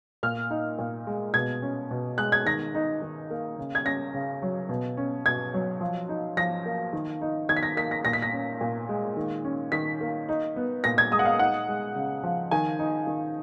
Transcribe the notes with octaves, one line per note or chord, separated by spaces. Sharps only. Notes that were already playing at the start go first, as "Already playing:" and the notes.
A#2 F6
D#4
A#2
G#3
B2 G#6
C#4
B2
G#3 F#6
G#6
D#3 A#6
D#4
D#3
A#3
C#3
G#6
C#4 A#6
C#3
F#3
B2
C#4
B2 G#6
F#3
F3
D#4
F3 A#6
A#3
D#3
D#4
D#3 G#6
B6
A#6
A#3 B6
A#6
A#2 A#6
B6
A#6
C#4
A#2
G#3
D#3
C#4
D#3 B6
A#3
D#4
B3
A#2 A#6
G#6
G#3 D#6
F#5
F5
D#4 F#5
G#3
C#3
F3
D#3 G#5
D#4
D#3